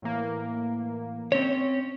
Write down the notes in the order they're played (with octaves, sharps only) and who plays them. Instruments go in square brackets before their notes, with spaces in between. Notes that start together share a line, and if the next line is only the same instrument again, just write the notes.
[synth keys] A2 E3 A#3
[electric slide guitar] C4 C#4 C#5